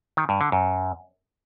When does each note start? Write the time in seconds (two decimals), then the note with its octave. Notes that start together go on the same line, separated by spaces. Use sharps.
0.17 D#3
0.29 G2
0.41 D3
0.52 F#2